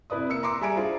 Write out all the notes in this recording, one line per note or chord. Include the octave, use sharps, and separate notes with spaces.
C3 E4 B4 D5 D#6
A#3 E6 C#7
A#5 C6 D6 E6
G3 G#4 E5 G#5 A#5 D7
D4 F4 G#4 C5